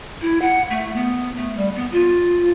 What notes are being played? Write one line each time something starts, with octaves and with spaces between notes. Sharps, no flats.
E4
F#5
A3
B3
A3
G3
B3
F4